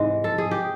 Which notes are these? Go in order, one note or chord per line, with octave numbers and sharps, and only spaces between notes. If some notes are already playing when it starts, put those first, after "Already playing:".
Already playing: G#2 C3 E3 G#3
A4
G#4
G4